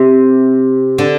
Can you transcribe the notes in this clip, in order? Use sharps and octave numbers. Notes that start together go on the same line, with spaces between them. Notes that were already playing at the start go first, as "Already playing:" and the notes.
Already playing: C3
D3